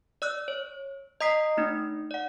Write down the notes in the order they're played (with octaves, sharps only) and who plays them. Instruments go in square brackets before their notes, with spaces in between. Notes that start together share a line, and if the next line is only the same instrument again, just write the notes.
[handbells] D5 E6 F#6
C#5
D#5 A#5 D#6 B6 C7
A3 D4 D#4
D5 F#5